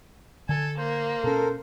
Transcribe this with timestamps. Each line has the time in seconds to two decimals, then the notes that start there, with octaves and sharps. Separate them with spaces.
0.49 D3 A4 G#5
0.78 A#3 C5
1.24 B2 C#4 A4 A#4